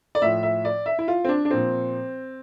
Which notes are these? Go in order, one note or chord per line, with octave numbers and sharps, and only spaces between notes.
D5
A2 F3 E5
E5
D5
E5
E4
F4
C4
D4
D4
A#2 F3 C4